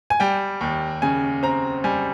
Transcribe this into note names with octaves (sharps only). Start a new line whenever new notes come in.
G#5
G3 G5
D#2
C#3 G#5
C4 A#5
G3 G#5